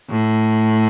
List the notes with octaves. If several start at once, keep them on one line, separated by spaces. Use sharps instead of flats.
A2